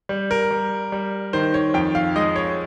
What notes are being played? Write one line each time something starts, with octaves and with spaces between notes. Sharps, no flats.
G3
A#4
G3
G3
D#3 C5
C#5
F2 G5
F5
G#3 D#5
C#5